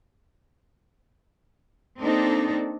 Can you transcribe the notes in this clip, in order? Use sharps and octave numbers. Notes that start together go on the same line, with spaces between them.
A#3 C4 D4 D#4 A4 D5